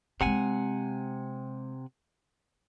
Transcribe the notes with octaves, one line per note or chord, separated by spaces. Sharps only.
C3 G#3 C4 F#5 G#5